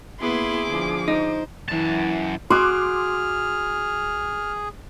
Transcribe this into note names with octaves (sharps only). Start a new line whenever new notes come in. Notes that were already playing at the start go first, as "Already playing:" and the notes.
A#3 B3 E4 G#4 C6 D6
D3 F3
D#4 C5
F#2 E3 A5
F#4 G#4 C6 D6 F6 F#6